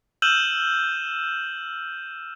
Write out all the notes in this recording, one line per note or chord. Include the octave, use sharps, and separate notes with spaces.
E6 F6 G6 D#7 E7 F#7